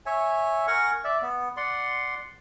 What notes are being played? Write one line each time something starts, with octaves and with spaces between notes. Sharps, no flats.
C#5 E5 G#5
A#4 F#5 G#5 C#6
D5 E5
B3
D5 F#5 C6